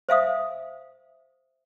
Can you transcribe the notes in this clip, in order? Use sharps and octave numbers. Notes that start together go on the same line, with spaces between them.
C5 E5 F5 D#6